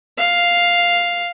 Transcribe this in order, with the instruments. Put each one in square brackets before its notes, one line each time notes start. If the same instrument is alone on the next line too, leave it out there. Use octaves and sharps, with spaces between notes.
[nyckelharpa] F5